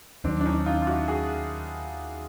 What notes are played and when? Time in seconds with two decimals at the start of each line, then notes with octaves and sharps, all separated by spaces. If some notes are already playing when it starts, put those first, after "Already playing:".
0.24 D#2 D#3 F#3 C4 D4
0.41 D4
0.46 C#4 D#4
0.66 D#4 F4
0.82 F4
0.87 E4 F#4
1.08 F#4 G#4